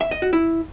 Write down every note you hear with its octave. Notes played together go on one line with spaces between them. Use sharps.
E5
D#5
F#4
E4